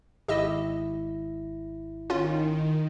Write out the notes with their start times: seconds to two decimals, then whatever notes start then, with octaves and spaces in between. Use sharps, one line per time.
0.28 G#1 E4 G4 D#5 E6 A#6
2.10 D#3 C#4 F4